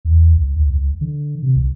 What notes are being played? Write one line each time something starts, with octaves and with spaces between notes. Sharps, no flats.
E2
C#2
D2
C#2
D3
C3
C2